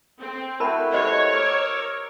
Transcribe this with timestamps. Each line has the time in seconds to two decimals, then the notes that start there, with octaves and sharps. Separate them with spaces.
0.20 C4
0.60 A3 E4 F#4 A#4 A5 B5
0.93 G4 C5 C#5 D#5
1.34 A#4 D6 E6